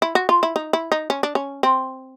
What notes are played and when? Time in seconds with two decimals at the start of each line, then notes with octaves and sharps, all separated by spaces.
0.02 E4
0.15 F#4
0.29 F4
0.43 E4
0.56 D#4
0.73 E4
0.92 D#4
1.10 C#4
1.23 D4
1.35 C#4
1.63 C4